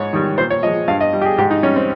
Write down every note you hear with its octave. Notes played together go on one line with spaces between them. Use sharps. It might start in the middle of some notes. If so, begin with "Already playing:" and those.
Already playing: G#2 C#5
D#3 G3
A#2 C5
C#5
F3 G#3 D#5
G2 F5
D#5
G3
G4
G#4
G#2 G4
D#4
G3 C#4
C4